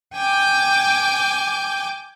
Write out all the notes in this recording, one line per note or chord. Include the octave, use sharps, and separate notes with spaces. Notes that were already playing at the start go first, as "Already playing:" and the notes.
G5 G#5 D6 G6